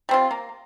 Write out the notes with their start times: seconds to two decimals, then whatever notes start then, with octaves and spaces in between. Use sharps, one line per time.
0.09 G3 C4 F4
0.31 A#3